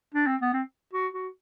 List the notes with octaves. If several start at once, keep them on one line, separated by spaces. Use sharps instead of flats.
D4
C4
B3
C4
F#4
F#4